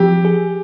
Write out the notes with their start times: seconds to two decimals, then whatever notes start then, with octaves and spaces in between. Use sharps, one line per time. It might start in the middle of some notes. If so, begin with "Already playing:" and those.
Already playing: F3 C4 G4
0.25 G#4